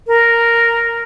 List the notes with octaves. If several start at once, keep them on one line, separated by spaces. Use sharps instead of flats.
A#4